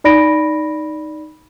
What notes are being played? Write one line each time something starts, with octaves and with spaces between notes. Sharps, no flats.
D#4 D5 B5 A#6 D7